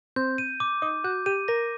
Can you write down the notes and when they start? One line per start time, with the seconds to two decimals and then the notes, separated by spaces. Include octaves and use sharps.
0.16 C4 G6
0.38 D#7
0.60 D6
0.82 D#4 D6
1.04 F#4 G6
1.26 G4 D#7
1.48 A#4 A#6